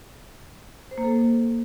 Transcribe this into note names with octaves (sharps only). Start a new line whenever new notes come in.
C5
A#3
A4